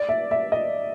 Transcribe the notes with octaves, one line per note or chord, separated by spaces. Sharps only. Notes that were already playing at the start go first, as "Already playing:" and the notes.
Already playing: D5
E5
E5
D#5